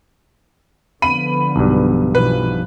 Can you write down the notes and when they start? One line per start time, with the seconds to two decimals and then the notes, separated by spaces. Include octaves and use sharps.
1.02 D3 F3 B3 B5 D#7
1.56 B1 G2
2.15 B2 E3 F3 B4